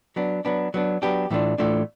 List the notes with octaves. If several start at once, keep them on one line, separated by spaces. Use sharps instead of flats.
F#3 B3 D4
F#3 B3 D4
F#3 B3 D4
F#3 B3 D4 G4
A2 E3 A3 D4 F4
A2 E3 A3 D4 F4